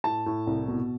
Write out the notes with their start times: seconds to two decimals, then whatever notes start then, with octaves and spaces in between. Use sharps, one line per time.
0.04 A2 A5
0.26 A2
0.47 C2
0.68 B2